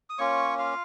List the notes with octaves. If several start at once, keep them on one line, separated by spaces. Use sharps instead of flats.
D#6
A#3 C#4 F4 C#5 C#6
F4 F5